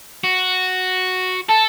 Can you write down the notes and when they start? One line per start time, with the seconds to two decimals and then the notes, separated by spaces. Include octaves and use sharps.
0.24 F#4
1.49 A4 A5